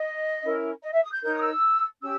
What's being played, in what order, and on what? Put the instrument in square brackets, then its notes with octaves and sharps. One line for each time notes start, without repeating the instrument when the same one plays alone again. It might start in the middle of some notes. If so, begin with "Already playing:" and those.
Already playing: [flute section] D#5
C#4 E4 A#4
D#5
E5
D#6
G6
D#4 A#4 C#5 G6
D#6
E6
C#4 G4 E6